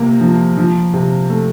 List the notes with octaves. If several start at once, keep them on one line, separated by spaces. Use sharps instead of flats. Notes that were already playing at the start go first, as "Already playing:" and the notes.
Already playing: C3 A#3
F3
F3
C3
A3